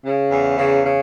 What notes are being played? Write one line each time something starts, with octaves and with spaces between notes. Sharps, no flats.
C#3
E2
C#3
C#3